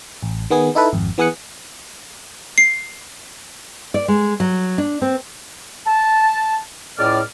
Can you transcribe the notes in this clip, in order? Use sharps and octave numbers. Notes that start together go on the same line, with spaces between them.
A1
D#3 B3 G#4
D#4 E4 A4 B4
G#1 F2
E3 B3 G#4 D#6 F#6 C#7
C7
D5
G#3
F#3
D4
C4
A5
C#2 A2 D5 F6